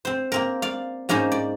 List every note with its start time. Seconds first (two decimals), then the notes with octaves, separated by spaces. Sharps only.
0.05 C4 C5
0.32 A#3 C4 A#4
0.62 D5 F5
1.09 G#2 A#3 C#4 D#4 C5
1.32 D5